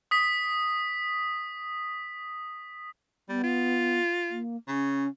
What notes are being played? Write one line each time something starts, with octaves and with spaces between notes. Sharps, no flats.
D#6 B6
G3 B3
F4
A#3
C#3 C#4